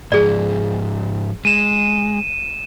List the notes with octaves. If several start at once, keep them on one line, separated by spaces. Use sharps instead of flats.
G#2 F3 G#4 D5
G#3 D#7 E7